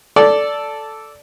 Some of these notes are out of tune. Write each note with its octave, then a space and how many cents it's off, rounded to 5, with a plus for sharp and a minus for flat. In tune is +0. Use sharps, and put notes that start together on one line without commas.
A4 +0 D5 -10